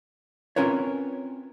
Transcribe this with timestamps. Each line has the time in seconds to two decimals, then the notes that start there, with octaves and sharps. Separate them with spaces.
0.56 C4 C#4 F4 A#4 B4 C#5